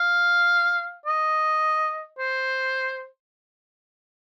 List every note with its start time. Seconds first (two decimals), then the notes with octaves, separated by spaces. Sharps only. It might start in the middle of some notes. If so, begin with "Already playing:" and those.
Already playing: F5
1.06 D#5
2.19 C5